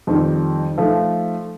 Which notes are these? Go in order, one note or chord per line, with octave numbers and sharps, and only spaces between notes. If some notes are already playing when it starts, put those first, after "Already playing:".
F2 D#3 G3
F3 A3 D#4